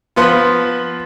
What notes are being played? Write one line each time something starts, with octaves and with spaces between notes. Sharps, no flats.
F3 B3 F4